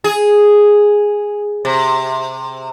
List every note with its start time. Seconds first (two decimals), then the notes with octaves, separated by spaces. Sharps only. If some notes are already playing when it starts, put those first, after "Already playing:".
0.04 G#4
1.65 C3